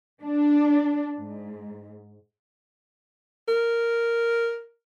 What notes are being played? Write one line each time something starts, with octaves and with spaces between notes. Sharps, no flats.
D4
G#2
A#4